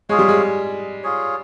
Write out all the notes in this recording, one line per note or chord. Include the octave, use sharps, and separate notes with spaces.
G#3 F4 G#4 C#5
G3
G#3
F4 G#4 C#5